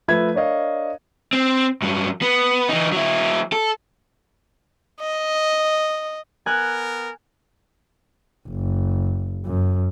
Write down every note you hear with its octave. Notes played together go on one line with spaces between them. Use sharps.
F3 A3 B4 E5 G#6
D4 A#4 C#5 D#5 F5
C4
G2 F#3
B3
E3 D#4
F#3 E4
A4
D#5
B3 A#4 G#5 F#6
F#1
F#2